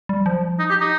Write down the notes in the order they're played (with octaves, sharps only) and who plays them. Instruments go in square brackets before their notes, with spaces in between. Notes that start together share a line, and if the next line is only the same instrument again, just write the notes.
[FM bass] G3
F3
[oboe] D#4
G4
D#4